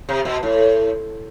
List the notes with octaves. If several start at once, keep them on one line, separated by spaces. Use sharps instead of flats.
C3
B2
A2